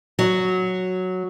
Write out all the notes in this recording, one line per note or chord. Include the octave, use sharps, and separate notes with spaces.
F#3